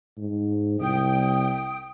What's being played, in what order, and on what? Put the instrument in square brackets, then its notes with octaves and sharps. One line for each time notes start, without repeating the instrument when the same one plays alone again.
[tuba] G#2
[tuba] C2 [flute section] G5 D#6